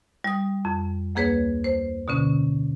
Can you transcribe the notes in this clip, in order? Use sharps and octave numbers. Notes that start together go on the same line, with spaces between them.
G3 D#6
F2
D2 A#3 G#4 B4 C#5
C5
B2 D3 C#4